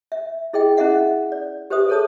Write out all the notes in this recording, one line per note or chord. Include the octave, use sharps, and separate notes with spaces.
E5
E4 G#4 D#5 G5
C#4 E4 G#4 D#5 E5 F#5
D5
G4 B4 C5 E5 D#6
G#4 A4 C#5 A5 D#6